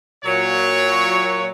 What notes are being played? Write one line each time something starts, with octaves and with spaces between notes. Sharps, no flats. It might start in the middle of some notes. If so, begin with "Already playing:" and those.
A#2 F#3 C#5